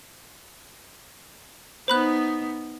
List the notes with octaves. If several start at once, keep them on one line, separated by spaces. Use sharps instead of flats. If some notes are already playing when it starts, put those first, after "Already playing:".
B3 D#4 C5 B5 F#6